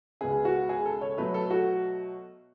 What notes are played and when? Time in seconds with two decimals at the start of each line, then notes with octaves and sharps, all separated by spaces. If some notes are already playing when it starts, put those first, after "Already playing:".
0.21 C#2 B2 G#3 B3 G#4
0.45 F#4
0.69 G#4
0.85 A4
1.01 C#5
1.17 B2 F#3 A3 B4
1.34 A4
1.50 F#4